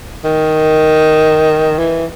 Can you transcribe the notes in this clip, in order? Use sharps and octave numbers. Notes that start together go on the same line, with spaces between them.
D#3
E3